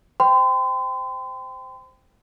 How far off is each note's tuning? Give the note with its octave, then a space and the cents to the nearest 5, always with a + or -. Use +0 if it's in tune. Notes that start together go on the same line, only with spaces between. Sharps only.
C5 +0 G5 +0 C6 -40